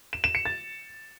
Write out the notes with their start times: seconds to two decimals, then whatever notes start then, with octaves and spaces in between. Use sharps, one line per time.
0.13 E7
0.24 E7
0.35 C#7
0.45 A6